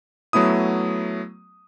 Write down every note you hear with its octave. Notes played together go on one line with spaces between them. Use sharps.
F#3 A3 B3 E4 D#6